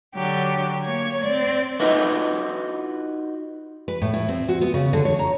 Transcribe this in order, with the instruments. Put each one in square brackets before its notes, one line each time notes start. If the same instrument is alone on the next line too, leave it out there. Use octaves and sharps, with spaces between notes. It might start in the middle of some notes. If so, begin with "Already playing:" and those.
[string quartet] D3 F#3 G4
A#3 C#5 G#6
C4 D5
[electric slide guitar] D#4 F4 F#4 B4 D#5
[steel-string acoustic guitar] B4
A2
E4
C4
F#4
B3
C#3
D3
C#5
A#5